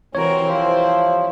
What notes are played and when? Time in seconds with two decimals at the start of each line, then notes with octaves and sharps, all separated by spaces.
0.15 C2 E3 G3 C4 F#4 A#4 C#5
0.48 C3 F3 E4